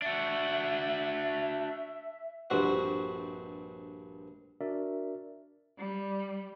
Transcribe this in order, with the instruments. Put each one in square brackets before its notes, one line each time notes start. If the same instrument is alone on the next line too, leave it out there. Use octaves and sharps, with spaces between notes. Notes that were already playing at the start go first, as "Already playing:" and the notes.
[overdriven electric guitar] D4 F#4 [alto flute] E5
[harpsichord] A#1 G2 G3 C4 F#4 F#5
[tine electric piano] D4 F#4 A#4 D5 E5
[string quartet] G3